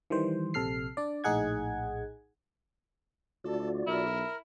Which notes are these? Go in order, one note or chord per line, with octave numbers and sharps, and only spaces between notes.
D#3 E3 G3 C5
A#1 C3 A4 F6 C7
D4 D5
A#1 A2 D#4 G#4 F#5 G#6
D2 F4 F#4 A4 D5
B1 E4 A#4